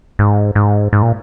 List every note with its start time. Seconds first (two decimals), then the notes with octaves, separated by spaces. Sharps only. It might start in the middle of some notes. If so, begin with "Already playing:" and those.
0.19 G#2
0.55 G#2
0.93 G#2
1.02 A#2